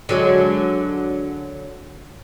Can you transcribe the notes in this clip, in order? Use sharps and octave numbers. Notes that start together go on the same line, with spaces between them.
D3 F#3 G#3